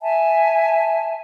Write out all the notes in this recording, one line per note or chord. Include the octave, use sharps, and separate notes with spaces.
E5 G#5 A5